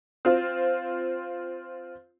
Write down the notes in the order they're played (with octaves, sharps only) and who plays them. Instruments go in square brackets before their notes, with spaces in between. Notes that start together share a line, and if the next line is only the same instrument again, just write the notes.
[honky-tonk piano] C4 F4